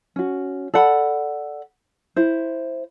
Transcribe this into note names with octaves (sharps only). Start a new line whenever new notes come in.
C#4 F#4
A4 D5 F#5 B5
E4 C5